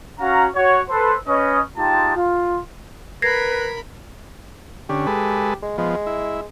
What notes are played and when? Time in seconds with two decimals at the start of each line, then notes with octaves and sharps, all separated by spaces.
0.20 C#4 F#4 F5 F#5 A#5
0.55 F#4 C#5
0.89 A4 B4 C5
1.28 C#4 B4 D#5
1.77 G#3 D#4 F4 G4 G5 A5
2.16 F4
3.22 A#4 B4 B5 G#6 A#6 C7
4.89 D3 C#4 G4
5.07 G#3 A4 B4
5.62 G#3
5.78 F3 G#3 B3
6.07 E4